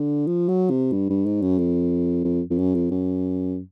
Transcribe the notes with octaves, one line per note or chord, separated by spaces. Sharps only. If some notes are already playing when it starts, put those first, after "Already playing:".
Already playing: D3
F3
F#3
C3
G2
G2
G#2
F#2
F2
F2
F2
F#2
F2
F#2